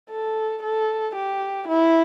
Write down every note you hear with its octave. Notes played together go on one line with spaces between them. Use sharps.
A4
A4
G4
E4